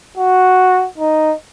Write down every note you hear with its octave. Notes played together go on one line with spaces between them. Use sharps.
F#4
D#4